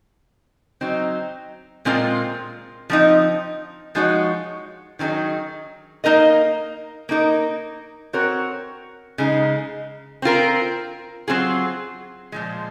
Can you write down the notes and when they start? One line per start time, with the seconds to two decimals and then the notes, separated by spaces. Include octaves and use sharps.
0.81 F#3 C4 D#4
1.85 A#2 G#3 C4 F4 A#4
2.90 F3 C4 D#4
3.95 F3 G#3 D#4 F#4 C#5
4.99 D#3 F#3 C4 D#4 G#4
6.04 A#3 D#4 A#4 D#5
7.09 A#3 D#4 A#4
8.13 C4 F#4 A#4 C#5
9.18 C#3 G#3 D#4
10.22 C4 F4 A#4
11.28 F#3 C4 F4 G#4
12.32 A#2 F3 G#3